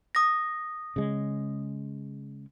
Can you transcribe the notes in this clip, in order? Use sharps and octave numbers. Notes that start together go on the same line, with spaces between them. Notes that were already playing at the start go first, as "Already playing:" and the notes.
D#6 A#6
C#3 G#3